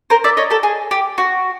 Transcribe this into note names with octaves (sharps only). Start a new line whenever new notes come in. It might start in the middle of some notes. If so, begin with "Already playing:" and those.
A#4 C5
D5 E5
C#5 D#5
G4 A4
G#4
G4
F#4